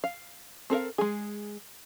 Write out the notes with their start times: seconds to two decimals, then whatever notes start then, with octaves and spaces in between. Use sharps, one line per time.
0.04 F5
0.70 C4 A4 A#4 F5
0.98 G#3 G#4